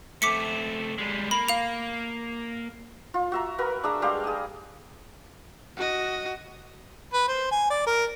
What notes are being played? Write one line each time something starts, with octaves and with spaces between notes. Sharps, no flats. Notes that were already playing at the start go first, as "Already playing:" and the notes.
A3 C4 D6 B6 C#7
G3 G#3
A#3 B5
F5 F7
F4
F#4 E5 A#5
F#4 A#4 B4
D4 G#4 E5 A#5
G3 G#3 G4 F5
G#4 D#5
F#4 D#5
B4
C5
G#5
D5
A#4